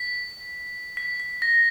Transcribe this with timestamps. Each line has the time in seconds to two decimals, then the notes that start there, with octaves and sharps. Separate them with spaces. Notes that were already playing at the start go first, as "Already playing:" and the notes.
Already playing: B6
0.97 B6
1.20 B6
1.42 A#6